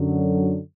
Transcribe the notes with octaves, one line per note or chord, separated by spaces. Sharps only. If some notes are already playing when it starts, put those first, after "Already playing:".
Already playing: F#2 D3 F#3